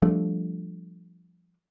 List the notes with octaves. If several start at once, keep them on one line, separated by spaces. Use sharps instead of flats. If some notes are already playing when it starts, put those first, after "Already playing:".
F3 G3 A3 D4